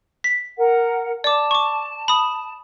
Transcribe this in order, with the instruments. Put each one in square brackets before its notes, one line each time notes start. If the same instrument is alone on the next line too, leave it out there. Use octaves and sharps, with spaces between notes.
[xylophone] B6
[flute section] A#4 F#5
[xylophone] D5 D6 [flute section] A5
[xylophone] C#6 D6
B5 D#6